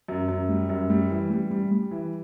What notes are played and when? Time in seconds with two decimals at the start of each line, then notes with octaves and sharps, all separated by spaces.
0.08 F#2
0.28 F#2
0.49 G3
0.70 F#2
0.90 G3
1.10 E3
1.30 G3
1.51 G3
1.71 G3
1.91 E3